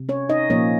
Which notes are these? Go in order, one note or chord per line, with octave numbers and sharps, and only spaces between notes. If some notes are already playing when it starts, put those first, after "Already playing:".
Already playing: C3
C#4 C#5
D#4 D#5
A#2 F3 A#3 C#4 C#5